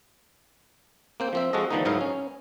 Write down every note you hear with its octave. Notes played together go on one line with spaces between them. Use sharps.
A#3 C4 G5
F3 C4 E5
F3 G#3 F#4 A4 D#5
D3 D#3 F3 A3 B3 D#4
G#2 F#3 D#4 E4 A#4 F5
C#4